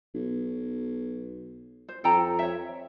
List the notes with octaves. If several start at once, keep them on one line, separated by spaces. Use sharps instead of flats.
B1
C5
F2 A4 G5 A#5
C#5 E5